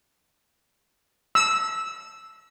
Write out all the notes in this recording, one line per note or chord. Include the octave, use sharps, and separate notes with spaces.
E6